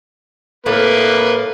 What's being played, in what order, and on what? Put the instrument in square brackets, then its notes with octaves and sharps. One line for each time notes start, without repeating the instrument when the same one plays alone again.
[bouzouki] A2 [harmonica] A#3 B4